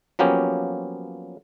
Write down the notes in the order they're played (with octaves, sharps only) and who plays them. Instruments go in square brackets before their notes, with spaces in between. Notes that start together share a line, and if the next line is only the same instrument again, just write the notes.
[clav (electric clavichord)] F3 F#3 A#3 B3 C#4 G4